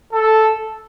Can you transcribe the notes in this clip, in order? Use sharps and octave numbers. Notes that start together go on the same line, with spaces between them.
A4